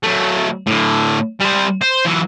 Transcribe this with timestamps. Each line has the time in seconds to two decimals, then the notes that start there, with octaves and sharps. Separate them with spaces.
0.03 F#3 A3
0.67 A2 D3
1.40 G3 C5
1.81 C5
2.05 E3 F#3